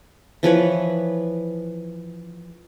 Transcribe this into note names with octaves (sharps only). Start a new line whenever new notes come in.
E3 F3 B4 C#5